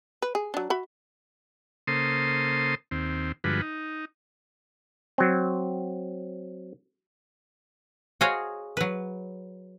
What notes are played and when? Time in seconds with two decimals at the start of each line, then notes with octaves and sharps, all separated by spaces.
0.22 B4
0.35 G#4
0.54 F#3 D4
0.70 F#4 E5 B5
1.87 C#3 A#3 A4 C5 C6 D#6
2.91 D#2 C4
3.44 G2 D3 F3 G#3 F#4 B4
3.62 D#4
5.18 F#3 C4
8.21 F#4 G#4 C5 C#5 D#5 F5
8.77 F#3 B4